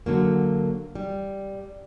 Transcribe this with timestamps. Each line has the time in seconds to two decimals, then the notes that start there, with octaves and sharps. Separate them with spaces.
0.06 D3 F#3 A#3
0.95 G3